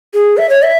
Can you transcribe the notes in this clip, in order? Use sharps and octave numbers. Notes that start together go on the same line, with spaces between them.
G#4
E5
C#5
E5